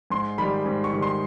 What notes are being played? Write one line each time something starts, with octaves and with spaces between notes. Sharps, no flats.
G#2 C6
D#3 G3 B5
G#2
C#6
D#3 G3
C6